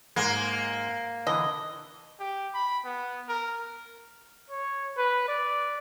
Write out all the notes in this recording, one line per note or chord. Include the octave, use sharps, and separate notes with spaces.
G#2 G#3 A#3
D3 E3 D#5
G4
B5
B3
A#4
C#5
B4
D5